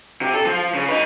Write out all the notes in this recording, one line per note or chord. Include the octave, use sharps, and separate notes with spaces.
C3
A4
F3
C#3
D#4 B4